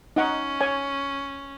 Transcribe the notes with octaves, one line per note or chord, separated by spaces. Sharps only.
C#4 D#4 F#5
C#5 G#5